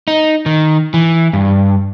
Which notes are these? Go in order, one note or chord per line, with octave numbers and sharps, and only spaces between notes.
D#4
D#3
E3
G2